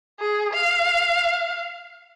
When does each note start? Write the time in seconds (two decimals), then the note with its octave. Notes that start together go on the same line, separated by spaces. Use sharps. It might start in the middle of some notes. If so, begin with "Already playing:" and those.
0.20 G#4
0.53 F5